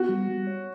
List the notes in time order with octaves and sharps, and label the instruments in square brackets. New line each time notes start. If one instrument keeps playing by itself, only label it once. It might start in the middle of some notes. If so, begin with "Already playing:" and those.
Already playing: [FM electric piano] B3 [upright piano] F#4
[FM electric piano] G3
G3
C#5